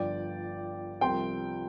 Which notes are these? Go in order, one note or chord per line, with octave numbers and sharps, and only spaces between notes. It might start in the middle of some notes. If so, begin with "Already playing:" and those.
Already playing: G1 G2 F3 D5 G5
C2 C3 F3 C4 G5 C6